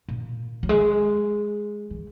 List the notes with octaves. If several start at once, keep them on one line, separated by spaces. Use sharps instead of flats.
A#2
F#3
G#3
E3